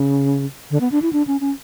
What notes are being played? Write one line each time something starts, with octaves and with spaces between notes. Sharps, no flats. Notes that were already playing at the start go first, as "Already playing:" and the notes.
Already playing: C#3
D3
B3
D4
E4
D4
C#4
C#4